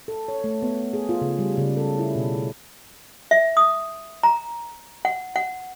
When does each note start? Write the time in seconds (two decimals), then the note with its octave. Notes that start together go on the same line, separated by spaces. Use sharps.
0.08 A4
0.28 C#5
0.44 A3
0.62 B3
0.93 G#4
1.09 F4
1.21 C#3
1.39 G3
1.57 C#3
1.77 A4
1.98 E4
2.15 B2
3.31 E5
3.57 D#6
4.23 A#5
5.05 F#5
5.36 F#5